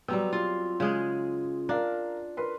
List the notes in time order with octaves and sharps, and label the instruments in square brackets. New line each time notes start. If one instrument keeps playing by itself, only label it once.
[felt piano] F#3 E6 [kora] G3 C4 [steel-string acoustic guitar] B3 A#5
[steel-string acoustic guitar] F4
[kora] C#3 G#3 G#4
[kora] D4 [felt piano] A#4 F5 A#5
[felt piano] A#4 B4 C6